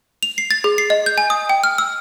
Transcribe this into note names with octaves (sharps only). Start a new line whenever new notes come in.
F7
C7
A6
G#4
C7
D#5
G6
G#5
D#6
G5
F6
E6